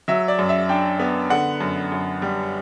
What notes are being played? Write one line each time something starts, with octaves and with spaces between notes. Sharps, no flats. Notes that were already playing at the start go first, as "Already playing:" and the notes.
F#3 E5
D5
F#2
E5
D4 G5
B3
D3 F#5
F#2
F#2
G3